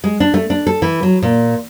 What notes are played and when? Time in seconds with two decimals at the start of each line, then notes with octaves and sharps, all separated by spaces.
0.04 G#3
0.20 D4
0.34 A3
0.50 D4
0.67 A4
0.82 E3
1.03 F#3
1.22 A#2